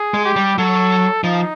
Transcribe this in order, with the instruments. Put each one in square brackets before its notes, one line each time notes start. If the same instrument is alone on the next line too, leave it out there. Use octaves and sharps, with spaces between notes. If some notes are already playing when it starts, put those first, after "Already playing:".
Already playing: [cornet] G#4
[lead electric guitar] G#3
[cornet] G4
[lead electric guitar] G3
[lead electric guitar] F#3 [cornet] A4
[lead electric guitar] F3 [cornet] D#4